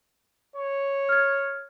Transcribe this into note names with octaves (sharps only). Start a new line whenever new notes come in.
C#5
F6 G#6